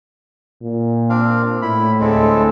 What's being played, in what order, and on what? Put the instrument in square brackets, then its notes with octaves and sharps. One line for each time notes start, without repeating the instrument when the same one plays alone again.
[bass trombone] A#2
[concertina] C4 D4 F5
[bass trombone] A2 [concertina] E4 B5
[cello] D2 A4 [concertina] G#3 C4